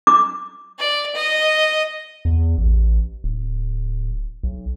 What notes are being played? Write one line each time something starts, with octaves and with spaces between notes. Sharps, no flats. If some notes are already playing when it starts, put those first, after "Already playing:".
D6
D5
D#5
E2
A1
D1
B1